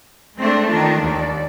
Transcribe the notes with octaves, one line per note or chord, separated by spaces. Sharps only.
G#3 A3 C4 D4
D#3 D4 F4
D#2 D5